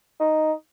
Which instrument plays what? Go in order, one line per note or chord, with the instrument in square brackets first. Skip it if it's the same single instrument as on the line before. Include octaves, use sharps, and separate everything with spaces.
[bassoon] D#4